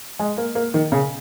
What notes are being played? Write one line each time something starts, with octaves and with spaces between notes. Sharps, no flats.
G#3
A#3
A#3
D#3
C#3